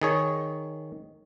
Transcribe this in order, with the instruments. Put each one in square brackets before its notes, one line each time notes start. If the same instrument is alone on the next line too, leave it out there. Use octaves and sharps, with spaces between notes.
[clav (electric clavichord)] D#3 G#4 C#5